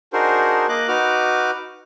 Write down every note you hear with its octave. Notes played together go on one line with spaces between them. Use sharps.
D4 D#4 F#4 G#4 A#4 C5
A#3 D#5 D6 F#6
D#4 F#4 B4 D6 F6